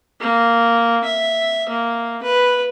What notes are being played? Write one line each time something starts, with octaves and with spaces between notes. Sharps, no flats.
A#3
E5
A#3
B4